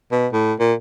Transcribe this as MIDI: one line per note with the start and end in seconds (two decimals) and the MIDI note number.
0.12 0.28 47
0.33 0.53 45
0.59 0.74 46